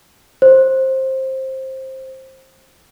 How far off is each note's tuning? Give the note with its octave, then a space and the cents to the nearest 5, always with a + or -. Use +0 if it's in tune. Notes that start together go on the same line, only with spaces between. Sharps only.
C5 +15